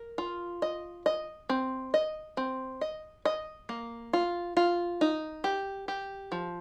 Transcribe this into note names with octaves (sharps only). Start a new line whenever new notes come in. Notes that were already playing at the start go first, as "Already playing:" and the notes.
Already playing: A#4
F4
D#5
D#5
C4
D#5
C4
D#5
D#5
A#3
F4
F4
D#4
G4
G4
F3